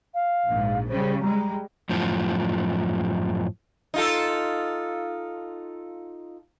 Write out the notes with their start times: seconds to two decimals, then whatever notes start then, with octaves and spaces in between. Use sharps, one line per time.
0.15 F5
0.47 A#1 G#2
0.89 C#3 G3 C5
1.22 G3 G#3 A#5
1.89 F#2 A2 F3
3.94 D#4 F4 A4